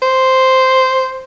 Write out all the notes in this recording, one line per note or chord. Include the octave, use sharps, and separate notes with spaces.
C5